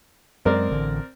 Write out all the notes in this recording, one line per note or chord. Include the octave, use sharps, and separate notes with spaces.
F#2 G#3 C4 A#4 D5
A1 D3